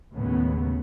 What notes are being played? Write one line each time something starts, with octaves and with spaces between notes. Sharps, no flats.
D#2 A2 C#3 G#3 B3